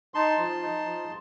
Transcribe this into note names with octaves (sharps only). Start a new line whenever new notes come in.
D#4 A5 C6
F3
D#4
F3